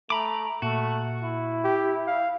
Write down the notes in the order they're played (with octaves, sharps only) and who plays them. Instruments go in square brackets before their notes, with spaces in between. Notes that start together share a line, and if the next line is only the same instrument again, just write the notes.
[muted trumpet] A3 [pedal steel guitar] A#5 B5 D6
[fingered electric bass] A#2 [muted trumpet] A3 [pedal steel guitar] F#4
[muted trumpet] E4
[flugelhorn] G4
F5